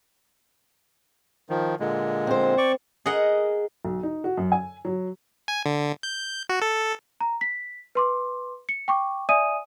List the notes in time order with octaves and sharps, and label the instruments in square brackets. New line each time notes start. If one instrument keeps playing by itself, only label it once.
[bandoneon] D#3 F3
A#2 D3 G#3
[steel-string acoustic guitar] C4 C5
[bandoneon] D5 C#6
[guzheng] G#4 A#4 D#5 F#5
[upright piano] B1
D#4
F#4
F#2
G#5
F#3
[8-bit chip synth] G#5
D3
G6
F#4
A4
[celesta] A#5
B6
B4 C6 D6
C#7
G5 C#6 D6
D5 E5 G#5 D#6 D#7